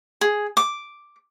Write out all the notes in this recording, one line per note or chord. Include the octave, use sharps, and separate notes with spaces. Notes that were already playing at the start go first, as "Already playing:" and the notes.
G#4
D6